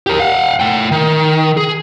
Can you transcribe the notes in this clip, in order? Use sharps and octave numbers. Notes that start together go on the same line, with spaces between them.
G4 A#4
F5 F#5
A3 G5
D#3
G#4